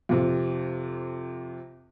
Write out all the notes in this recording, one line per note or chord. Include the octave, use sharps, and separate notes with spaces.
F2 C3